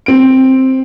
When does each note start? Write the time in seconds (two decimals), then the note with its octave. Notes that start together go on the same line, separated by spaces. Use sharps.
0.06 C4 D7